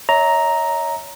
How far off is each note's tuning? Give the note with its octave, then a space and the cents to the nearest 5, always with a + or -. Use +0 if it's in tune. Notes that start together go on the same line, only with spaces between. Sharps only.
C#5 +25 E5 -35 A#5 +0